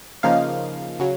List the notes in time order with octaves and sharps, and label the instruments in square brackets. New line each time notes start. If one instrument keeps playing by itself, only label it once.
[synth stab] C#3 F3 A#3 D#4 F5
C#3 F#3